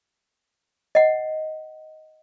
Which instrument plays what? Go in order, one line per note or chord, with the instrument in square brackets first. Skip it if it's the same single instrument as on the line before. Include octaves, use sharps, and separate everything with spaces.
[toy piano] D#5 F#5